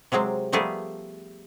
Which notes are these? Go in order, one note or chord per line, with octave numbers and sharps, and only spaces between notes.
C3 F#3 G#3 C4
F3 G3 A3 B3 G#4 A#4